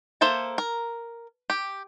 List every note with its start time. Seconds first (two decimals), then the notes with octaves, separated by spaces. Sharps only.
0.21 A#3 A4 C5 E5 A5
0.58 A#4
1.50 G4